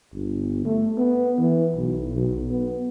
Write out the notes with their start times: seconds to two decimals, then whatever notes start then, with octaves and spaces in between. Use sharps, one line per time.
0.14 G1
0.66 A3
0.98 B3
1.39 E3
1.76 B1
2.14 B1
2.51 B3